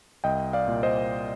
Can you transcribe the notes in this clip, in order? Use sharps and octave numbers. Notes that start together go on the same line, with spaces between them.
C2 D#5 G5
D5 F5
A#2
C5 D#5